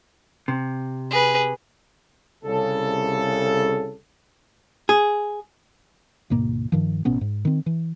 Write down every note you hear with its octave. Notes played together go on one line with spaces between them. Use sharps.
C3
G#4 B4
C2 C#3 A4
G#4
D2 G#2 B2 A#3
G2 D#3 F3
A1 B2 B3 C#4
G#2
D#3 C4
E3